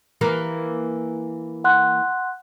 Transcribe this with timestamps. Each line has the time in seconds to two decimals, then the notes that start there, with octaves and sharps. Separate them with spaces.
0.21 E3 A#3 A#4
1.64 F#5 C6 F#6